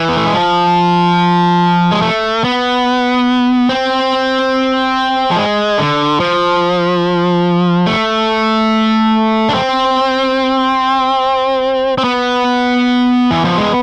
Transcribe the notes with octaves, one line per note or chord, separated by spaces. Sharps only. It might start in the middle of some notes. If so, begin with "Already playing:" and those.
Already playing: E3
B3
A3
G#3
F3
G#3
A3
B3
C4
F3
G#3
D3
F3
A3
D4
C4
C4
B3
E3
F3
G#3